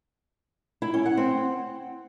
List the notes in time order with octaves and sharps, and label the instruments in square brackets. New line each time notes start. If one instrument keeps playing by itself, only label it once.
[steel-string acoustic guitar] E4
C#4
F#5
C4